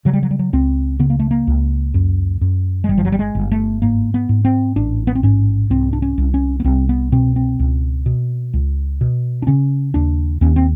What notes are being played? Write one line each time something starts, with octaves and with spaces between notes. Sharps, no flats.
C#3 F#3
G3
F#3
G3
F#3
C#2 C4
C#3 B3
A#3
A3
A#3
C#2
F#2
F#2
G#3
G1 G3
F3
F#3
G3
G#3
G1
A3
G#2 A#3
B3
G#2
C4
A1 D4
B3
C4
G#2 C#4
C2 C4
D4
C#4
C2
C#4
B3
C2 C4
B3
B2 C4
C4
C#2
B2
C#2
B2
D4
C#3 C#4
D#2 D4
D#2 C#4
C4